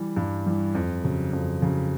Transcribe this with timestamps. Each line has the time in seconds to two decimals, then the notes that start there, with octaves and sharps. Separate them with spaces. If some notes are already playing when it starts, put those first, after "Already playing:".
Already playing: E3 G3
0.17 G2
0.46 E3 G3
0.75 F2
1.04 C#3 F#3
1.33 F2
1.62 C#3 F#3